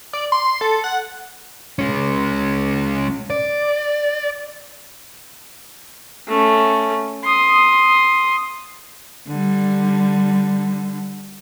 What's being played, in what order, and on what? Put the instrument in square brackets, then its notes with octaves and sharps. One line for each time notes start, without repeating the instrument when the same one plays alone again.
[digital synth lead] D5
C6
A4
F#5
[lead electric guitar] G#3 C#4
D5
[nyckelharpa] A3 C#4
C6 D#6
[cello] D3 G3